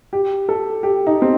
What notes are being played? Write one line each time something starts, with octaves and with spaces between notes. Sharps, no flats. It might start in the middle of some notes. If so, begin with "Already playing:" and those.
G4
A4
G4
D#4
C4